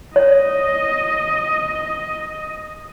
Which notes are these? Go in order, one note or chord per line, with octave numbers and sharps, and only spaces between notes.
C#5 D#5